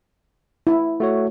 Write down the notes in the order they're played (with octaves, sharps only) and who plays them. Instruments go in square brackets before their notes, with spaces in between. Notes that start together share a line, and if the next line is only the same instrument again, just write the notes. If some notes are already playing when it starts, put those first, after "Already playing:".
[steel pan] E4
[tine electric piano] A3 F#4 C#5